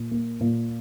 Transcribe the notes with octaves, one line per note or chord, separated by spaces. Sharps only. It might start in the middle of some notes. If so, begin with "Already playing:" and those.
Already playing: A#2
A#3
A#2